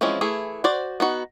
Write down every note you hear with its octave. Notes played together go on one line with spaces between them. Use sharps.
E3 F3 G#3 C4 C#4
E3 A3 E4 G#4
F#4 C5 D5
B3 D#4 F#4